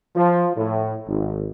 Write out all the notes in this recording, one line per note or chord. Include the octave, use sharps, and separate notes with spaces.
F3
A2
G#1